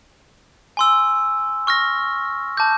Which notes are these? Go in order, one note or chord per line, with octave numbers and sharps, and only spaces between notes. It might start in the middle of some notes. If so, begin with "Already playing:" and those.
G#5 C6 E6
C#6 F6 A#6
A5 D6 G6